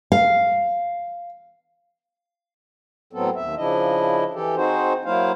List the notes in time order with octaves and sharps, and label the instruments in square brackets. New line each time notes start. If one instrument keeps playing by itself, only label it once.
[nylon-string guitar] F5
[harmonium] A2 F#3 B3 C4 A4
D#2 E5
C#3 F3 D4 E4 D#5
E3 G4 A4
C4 D#4 F#4 G#4 C5
F#3 A#3 E4 C5 F5